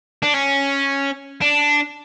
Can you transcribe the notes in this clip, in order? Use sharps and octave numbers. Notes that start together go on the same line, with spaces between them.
D4
C#4
D4